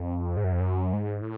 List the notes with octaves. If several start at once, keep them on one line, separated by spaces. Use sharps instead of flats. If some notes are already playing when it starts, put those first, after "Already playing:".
Already playing: F2
G#2
F#2
F2
F#2
G#2
A2